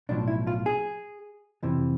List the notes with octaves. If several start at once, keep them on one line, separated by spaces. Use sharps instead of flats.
B1 A2 F3 D4
E4
F4
G#4
F2 C3 E3